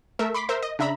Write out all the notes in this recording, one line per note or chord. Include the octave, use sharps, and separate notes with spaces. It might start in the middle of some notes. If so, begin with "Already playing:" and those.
A3 A#4 E5
B5 C6 D6 B6
A#4 C5 E5
D#5
C#3 D4 E5 A#5 B5